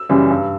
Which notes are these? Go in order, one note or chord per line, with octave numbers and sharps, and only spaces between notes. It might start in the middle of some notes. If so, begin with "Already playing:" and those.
Already playing: E6
F#2 C#3 E3 G3
G2